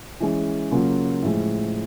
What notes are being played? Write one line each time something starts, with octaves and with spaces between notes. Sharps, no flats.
E3 G#3 C#4
C#3 F#3 A#3 C#4 F4
A2 F3 G#3